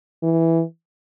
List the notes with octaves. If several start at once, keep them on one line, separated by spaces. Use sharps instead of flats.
E3